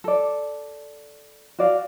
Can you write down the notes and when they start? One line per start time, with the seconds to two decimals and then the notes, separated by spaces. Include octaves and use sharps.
0.04 A4 D5
1.59 F#4 D5 F5